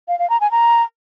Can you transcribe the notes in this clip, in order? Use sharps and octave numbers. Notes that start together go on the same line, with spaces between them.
F5
F5
A#5
G#5
A#5